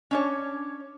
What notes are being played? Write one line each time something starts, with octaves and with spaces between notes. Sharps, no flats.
C#4 D4 C#5